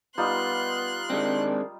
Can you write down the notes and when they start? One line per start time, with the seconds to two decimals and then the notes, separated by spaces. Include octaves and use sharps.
0.18 G3 B3 D#4 F4 C6 F#6
1.10 D#3 G#3 C4 D4